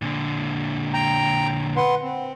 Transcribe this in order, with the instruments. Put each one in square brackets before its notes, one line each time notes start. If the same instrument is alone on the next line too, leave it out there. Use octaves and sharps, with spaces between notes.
[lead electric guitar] A#2 D3
[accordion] G5 A#5
B4 F#5 C6
C4